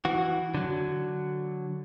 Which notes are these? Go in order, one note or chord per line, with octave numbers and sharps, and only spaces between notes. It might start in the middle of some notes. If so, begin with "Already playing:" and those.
E3 F#4
D3 F#3